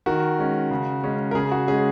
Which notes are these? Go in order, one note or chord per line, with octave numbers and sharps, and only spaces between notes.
D#3 F#4 A#4
G#3 C#4
C#3
G#3 C#4
A#4
C#3 G#4
F#4
G#3 C#4 G#4